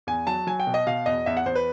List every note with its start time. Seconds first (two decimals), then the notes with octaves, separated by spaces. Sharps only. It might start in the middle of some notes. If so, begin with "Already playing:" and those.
0.07 E2 G#5
0.27 F#3 A5
0.47 F#3 G#5
0.60 G5
0.67 B2
0.74 D#5
0.87 B2 F5
1.06 E2 D#5
1.26 E2 E5
1.37 F#5
1.46 E2 C5
1.55 B4